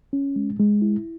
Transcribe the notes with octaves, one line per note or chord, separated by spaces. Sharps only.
C#4
G#3
G#3
E4